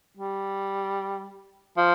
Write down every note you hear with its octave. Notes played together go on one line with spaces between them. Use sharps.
G3
F3